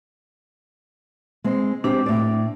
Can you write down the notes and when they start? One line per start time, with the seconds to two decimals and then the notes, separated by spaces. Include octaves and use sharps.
1.44 G#3 C4
1.84 C4 D4 G4
2.06 A2 D5